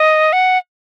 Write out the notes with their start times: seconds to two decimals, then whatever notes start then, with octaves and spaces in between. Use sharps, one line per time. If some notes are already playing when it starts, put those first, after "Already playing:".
Already playing: D#5
0.33 F#5